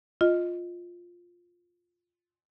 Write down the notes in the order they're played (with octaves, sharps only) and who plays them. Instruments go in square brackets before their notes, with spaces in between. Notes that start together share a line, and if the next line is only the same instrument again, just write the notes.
[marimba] F4 D#5